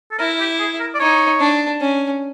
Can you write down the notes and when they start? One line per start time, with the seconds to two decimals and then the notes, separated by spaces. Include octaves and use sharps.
0.11 A4
0.19 E4 A#4
0.40 G4
0.59 G#4
0.80 A#4
0.95 D5
1.00 D#4 C#5
1.40 D4
1.80 C#4